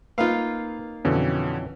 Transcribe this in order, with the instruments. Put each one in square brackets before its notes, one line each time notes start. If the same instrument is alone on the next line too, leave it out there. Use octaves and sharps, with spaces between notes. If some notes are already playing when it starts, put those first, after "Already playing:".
[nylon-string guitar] A#3 C4 D#4 [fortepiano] F4 F5 [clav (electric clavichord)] B4
[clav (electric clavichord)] F2 E3 C#4 [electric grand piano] B2 D3